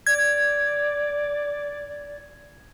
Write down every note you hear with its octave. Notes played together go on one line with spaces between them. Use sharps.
D5 G#6